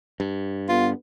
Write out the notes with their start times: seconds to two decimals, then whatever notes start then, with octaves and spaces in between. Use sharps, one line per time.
0.20 G2
0.69 D3 B3 F4